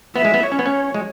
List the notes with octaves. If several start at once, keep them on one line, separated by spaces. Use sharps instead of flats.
B3 E5
G#3
B3
C#5
C#4
B3
C#4
G#3